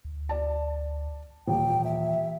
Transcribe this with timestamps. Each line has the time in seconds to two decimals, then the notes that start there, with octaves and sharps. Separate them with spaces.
0.05 D2
0.29 D5 A5
1.48 D#1 E3 G5
1.84 E5